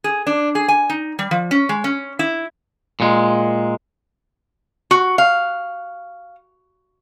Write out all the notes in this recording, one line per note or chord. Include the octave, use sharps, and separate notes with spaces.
G#4
D4
G#4
G#5
D#4
G3
F3
C#4
G#3
C#4
E4
A#2 G#3
F#4
F5